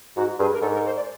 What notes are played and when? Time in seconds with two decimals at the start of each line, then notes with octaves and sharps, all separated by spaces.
0.16 G#2 F#4
0.39 G2 G#4
0.53 A#4
0.62 G#2 A4
0.74 A#4
0.85 C5
0.96 D5